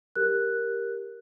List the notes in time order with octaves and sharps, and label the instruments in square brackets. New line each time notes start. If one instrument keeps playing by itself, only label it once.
[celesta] G4 A#4 F#6